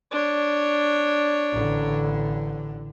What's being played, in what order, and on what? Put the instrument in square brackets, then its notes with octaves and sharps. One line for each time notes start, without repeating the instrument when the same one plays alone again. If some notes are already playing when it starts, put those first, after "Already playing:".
[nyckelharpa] D4 C#5
[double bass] A1 D3